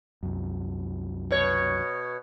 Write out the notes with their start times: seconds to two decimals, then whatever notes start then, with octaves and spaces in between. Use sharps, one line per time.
0.23 C2 F#2
1.31 B2 C#5